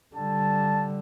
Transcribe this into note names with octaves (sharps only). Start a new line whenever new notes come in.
D3 G3 A5